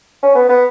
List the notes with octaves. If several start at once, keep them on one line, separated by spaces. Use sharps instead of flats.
C#4
B3
B3